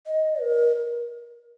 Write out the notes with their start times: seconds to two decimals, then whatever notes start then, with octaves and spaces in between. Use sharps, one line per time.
0.07 D#5
0.41 A#4